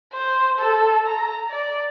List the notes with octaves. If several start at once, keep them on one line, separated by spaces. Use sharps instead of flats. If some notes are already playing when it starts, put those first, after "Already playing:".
C5
A4
A#5
D5